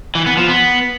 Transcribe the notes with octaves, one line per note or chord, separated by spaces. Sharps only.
E3
B3
F3
B3